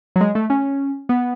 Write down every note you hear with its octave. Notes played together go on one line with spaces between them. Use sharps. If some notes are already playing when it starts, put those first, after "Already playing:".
F#3
G#3
A3
C#4
B3